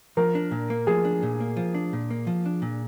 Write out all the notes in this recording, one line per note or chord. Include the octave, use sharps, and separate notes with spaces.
F3 A#4
D4
A#2
A#3
F3 G#4
D4
A#2
A#3
F3
D4
A#2
A#3
F3
D4
A#2